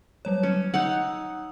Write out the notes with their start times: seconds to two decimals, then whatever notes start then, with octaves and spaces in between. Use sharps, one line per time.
0.25 F#3 G3 C#5
0.43 C#4
0.74 D#4 C#5 F#5 E6